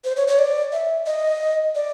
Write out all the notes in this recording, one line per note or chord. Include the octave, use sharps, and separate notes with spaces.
C5
C#5
C#5
D5
E5
D#5
D5